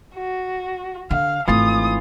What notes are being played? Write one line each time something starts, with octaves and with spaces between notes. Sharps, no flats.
F#4
D3 F5
G#1 E3 A3 F4 D#6